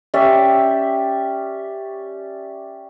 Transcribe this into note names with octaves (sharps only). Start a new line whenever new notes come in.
C#4 G4 D5 E5